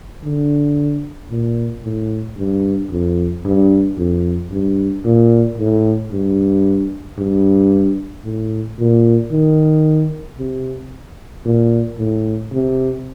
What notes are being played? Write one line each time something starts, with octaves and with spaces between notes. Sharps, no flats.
D3
A#2
A2
G2
F2
G2
F2
G2
A#2
A2
G2
G2
A2
A#2
D#3
C3
A#2
A2
C3